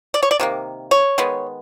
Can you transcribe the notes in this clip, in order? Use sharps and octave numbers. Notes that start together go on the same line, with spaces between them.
D5
C#5
D5
C3 D#3 A#3
C#5
D#3 G#3 B3